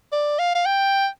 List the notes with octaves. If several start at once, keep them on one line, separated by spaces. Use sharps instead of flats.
D5
F5
F5
G5